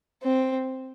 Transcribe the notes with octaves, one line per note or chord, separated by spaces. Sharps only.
C4